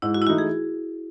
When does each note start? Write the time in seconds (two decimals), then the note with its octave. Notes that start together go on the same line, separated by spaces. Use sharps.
0.02 G#2 E4
0.14 F#4
0.22 E4
0.27 E3 A3 D#4 F#4
0.38 G#4